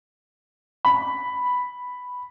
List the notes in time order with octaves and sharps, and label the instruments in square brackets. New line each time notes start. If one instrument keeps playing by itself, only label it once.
[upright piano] B5